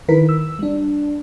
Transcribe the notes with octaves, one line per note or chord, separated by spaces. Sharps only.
D#3 E4 A#4 B4 B6
E6
G3 D4